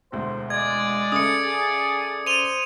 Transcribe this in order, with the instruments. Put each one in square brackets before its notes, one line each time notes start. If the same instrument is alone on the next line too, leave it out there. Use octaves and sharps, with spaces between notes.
[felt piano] E1 D2 [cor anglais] C5
[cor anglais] G#3 [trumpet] D5 [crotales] G#6
[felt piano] C#3 A3 [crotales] D#6 C#7
[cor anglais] G#4
[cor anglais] C5 [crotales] D#7 F7 G7